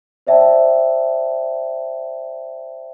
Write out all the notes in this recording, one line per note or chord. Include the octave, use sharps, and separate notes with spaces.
C5 D5 E5 G5 A5